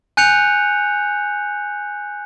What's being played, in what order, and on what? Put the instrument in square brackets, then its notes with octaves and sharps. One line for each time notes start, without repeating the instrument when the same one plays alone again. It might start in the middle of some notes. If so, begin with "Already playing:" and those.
[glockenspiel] G#5 F#6 G6 C#7 F7